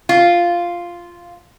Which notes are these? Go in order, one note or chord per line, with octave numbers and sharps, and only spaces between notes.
F4